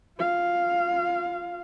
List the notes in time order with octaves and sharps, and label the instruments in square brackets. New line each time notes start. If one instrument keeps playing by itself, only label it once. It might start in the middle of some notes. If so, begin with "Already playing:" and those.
[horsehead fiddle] F4 F5